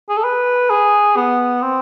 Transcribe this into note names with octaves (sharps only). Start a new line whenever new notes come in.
G#4
A4
B4
G#4
B3
C4